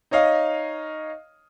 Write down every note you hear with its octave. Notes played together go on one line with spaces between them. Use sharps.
D#4 C#5 D#5 F5